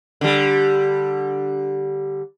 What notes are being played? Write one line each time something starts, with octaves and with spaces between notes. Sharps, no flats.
D3 G3